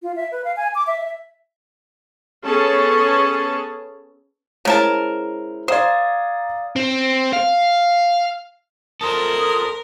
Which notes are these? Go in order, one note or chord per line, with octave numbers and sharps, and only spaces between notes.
F4
E5
B4
F5
G#5
D6
E5
E5
B3 C#4 G#4 A4 A5
C#3 G#3 E4 A#4 C5 A5
C5 D5 F5 F#5 A#5 D#6 G#6
C4
F5
A4 A#4 C5 D#6